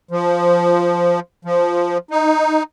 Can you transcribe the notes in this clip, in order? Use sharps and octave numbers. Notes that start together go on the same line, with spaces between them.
F3
F3
D#4